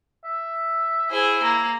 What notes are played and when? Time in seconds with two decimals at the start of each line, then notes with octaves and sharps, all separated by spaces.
0.24 E5
1.10 E4 G#4 C5
1.42 A#3